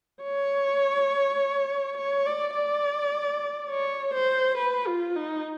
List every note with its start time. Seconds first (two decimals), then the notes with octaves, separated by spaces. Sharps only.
0.23 C#5
1.97 C#5
2.26 D5
2.55 D5
3.71 C#5
4.14 C5
4.58 B4
4.87 F4
5.16 D#4